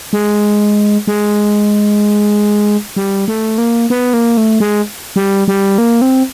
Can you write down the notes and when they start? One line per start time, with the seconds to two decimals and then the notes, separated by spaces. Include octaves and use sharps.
0.13 G#3
1.07 G#3
2.96 G3
3.28 A3
3.58 A#3
3.90 B3
4.13 A#3
4.37 A3
4.60 G#3
5.16 G3
5.48 G3
5.78 A#3
6.02 C4